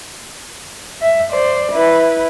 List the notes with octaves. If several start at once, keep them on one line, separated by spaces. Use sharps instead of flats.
E5
C5 D5
E4 B4